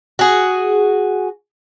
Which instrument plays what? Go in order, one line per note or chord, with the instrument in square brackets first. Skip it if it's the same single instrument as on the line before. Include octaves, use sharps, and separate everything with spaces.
[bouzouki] F#4 G#4